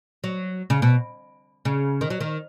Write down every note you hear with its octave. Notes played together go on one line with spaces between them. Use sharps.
F#3
C#3
B2
C#3
D#3
F#3
D#3